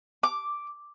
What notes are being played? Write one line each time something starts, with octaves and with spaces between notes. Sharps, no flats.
D6